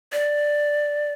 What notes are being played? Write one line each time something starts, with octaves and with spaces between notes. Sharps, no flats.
D5